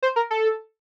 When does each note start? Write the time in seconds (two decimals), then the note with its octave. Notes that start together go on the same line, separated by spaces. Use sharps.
0.02 C5
0.16 A#4
0.31 A4